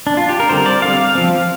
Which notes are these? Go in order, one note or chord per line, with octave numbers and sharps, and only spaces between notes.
D4
F4
G4
A#4
D3 G3 C4 C5
D5
D3 G3 C4 F5
F3 C4